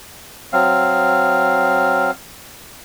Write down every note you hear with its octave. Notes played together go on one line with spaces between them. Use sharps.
F#3 C4 F5